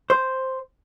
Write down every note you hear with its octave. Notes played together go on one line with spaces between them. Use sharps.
C5